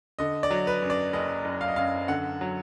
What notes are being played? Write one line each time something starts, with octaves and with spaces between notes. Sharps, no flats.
D3 D#5
D5
F#3
B4
F#2
D5
F#1 D#5
F#1
F5
D#5
F#2 F5
D3 F#5
F#3